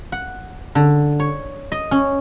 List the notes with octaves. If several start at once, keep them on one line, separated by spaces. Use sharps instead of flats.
F#5
D3
C#5
D#5
C#4